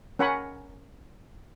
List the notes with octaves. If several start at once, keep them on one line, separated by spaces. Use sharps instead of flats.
C#4 A#4 F#5 G#5 B5 C#6